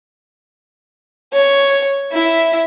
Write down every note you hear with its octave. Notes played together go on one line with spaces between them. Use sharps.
C#5
E4 E5